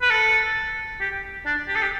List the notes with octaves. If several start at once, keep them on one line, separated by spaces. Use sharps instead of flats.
B4
A4
G4
D4
G4
A4
G4